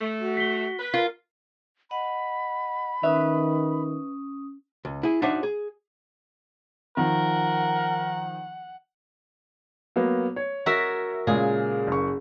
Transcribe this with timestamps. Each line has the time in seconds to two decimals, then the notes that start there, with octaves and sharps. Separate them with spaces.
0.01 A3
0.20 F#4
0.37 B6 G7
0.79 B4
0.94 F4 A#4
1.91 D#5 F#5 B5
3.03 D#3 C#4 B4 E5 D#6
4.85 C#2
5.03 E4 G#4
5.22 D4 D#4 F#4 C5 C#5 E5
5.43 G#4
6.97 D#3 F3 A#4 F#5
9.96 F#3 A#3 B3
10.36 C#5
10.66 F#4 A#4 E5
11.27 A#2 C#3 G#3 G#4
11.87 F#1 C#6